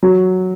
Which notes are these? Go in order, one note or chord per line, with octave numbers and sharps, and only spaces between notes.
F#3